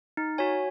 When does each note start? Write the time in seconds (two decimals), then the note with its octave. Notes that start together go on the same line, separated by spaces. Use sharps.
0.17 D#4
0.38 F#4 C#5 G#5